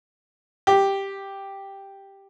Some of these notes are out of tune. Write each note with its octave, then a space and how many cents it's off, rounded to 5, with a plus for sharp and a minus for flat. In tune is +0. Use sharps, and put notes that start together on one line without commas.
G4 +0